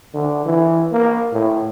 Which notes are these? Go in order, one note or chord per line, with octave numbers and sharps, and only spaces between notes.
D3
E3
A#3
A2